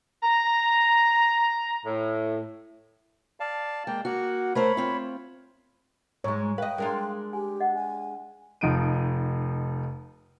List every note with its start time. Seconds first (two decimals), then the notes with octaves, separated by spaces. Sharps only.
0.23 A#5
1.86 A2
3.40 D5 F5 A5
3.87 G#3 A#3 G5
4.05 A#3 F#4 F#5
4.55 A3 A#4 C5 C#5 B5
4.77 C4 F4
6.24 G#2 G#3 C#5
6.58 B4 D#5 F5 G5
6.78 G#3 D4 F4 A4 A#4
7.33 G4 G#5
7.60 D#5 F#5
7.75 G#5
8.61 F1 F3 D#4 D7 D#7